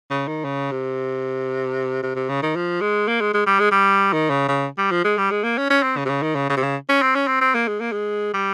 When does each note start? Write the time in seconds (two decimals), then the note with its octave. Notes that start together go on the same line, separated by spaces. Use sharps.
0.11 C#3
0.28 D#3
0.45 C#3
0.72 C3
2.03 C3
2.16 C3
2.29 C#3
2.43 D#3
2.56 F3
2.81 G#3
3.08 A#3
3.21 G#3
3.34 G#3
3.47 G3
3.60 G#3
3.72 G3
4.13 D#3
4.30 C#3
4.49 C#3
4.78 G3
4.91 F3
5.05 G#3
5.18 G3
5.31 G#3
5.44 A#3
5.58 C#4
5.70 C#4
5.83 C4
5.97 C#3
6.06 C3
6.09 C#3
6.23 D#3
6.36 C#3
6.50 C#3
6.57 C3
6.63 C#3
6.89 C#4
7.03 C4
7.15 C#4
7.28 C4
7.41 C4
7.55 A#3
7.68 G#3
7.81 A#3
7.92 G#3
8.34 G3